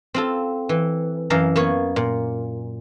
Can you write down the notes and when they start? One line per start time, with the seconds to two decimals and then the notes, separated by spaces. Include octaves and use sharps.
0.14 C4 F4 A4
0.69 E3
1.30 F#2 E3 F5 A5 A#5
1.56 A#3 B3 C#5
1.96 A#2